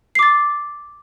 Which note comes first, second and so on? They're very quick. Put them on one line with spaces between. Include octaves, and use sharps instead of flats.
C7 D6 A6